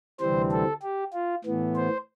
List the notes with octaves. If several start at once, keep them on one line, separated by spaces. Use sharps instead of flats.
D2 C3 E3 G3 C4 C5
A4
G4
F4
A2 E3 B3
C5